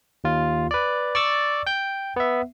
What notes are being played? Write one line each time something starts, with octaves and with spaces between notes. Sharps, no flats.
D#2 F4
B4 D5
D5 C#6 E6 A6
G5 G6
B3 E5